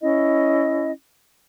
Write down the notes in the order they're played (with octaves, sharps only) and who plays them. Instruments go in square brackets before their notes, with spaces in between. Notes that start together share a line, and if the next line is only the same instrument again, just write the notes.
[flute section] C#4 E4 D#5